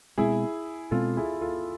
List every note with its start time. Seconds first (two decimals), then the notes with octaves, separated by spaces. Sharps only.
0.18 B2 G#3 C4 E4 G#4
0.91 B2 G#3 C4 F4 A4
1.17 E4 G#4
1.41 F4 A4